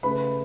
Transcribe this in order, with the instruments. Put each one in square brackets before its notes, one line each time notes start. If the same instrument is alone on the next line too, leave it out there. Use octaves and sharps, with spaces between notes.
[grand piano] C#3 A3 B4 B5